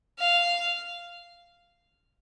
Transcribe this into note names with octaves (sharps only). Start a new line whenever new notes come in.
F5